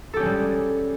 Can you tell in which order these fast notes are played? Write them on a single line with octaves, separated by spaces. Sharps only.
A4 G4 C#4 G#3 G3